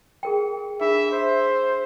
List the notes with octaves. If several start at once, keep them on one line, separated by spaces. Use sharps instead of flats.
G#4 A#4 G5
D4 G#4 E5 B5
C5